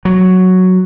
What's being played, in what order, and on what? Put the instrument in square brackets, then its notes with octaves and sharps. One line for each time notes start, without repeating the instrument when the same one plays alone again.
[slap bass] F#3